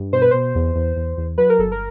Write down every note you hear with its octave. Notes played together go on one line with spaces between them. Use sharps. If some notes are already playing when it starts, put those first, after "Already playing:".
Already playing: G2
B2 C5
B4
B2 C5
E2
E2
E2
E2
F#3 B4
A#4
G1 A4
A#4